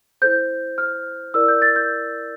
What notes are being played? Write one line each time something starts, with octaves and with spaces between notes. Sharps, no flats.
E4 A4 C5 G6
F6
E4 A#4 D5 E6
G6
A6
G6